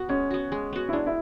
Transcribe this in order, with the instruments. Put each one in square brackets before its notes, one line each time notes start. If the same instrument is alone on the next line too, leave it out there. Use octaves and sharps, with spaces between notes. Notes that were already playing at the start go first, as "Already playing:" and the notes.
Already playing: [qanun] B3 F#4
[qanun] G#3 [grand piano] C#4
[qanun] B3 F#4
G#3
B3 F#4
[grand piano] E4
[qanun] G#3 [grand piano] D4
[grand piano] E4